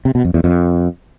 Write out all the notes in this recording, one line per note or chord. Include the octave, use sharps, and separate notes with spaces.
C3
B2
F2
E2
F2